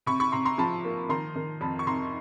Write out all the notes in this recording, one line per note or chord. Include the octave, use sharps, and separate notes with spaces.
C3 B5 C#6
B5 C#6
C3 A#5 C6
A#5 C6
F3 A5 B5
A#3
D#3 A#5 C6
D#3
F2 A5 B5
C#6
C3 A#5 C6